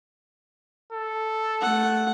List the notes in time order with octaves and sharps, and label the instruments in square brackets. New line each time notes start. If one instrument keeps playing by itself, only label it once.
[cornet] A4
[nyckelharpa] A3 F#5